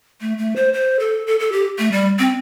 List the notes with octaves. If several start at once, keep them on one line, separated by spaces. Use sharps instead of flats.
A3
A3
C5
C5
A4
A4
A4
G4
A3
G3
C4